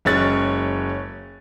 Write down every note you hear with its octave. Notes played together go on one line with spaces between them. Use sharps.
F#1 G#3 C#4 C#5 F#6 A6